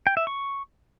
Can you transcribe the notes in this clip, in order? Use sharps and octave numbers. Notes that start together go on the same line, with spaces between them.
G5
E5
C#6